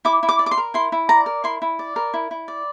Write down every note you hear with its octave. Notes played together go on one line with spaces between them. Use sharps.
E4 D6
E4
D6
D5
D6
C6
A#4
E4 C6
E4
D5 A#5
A#4
E4 C6
E4
D5
A#4
E4
E4
D5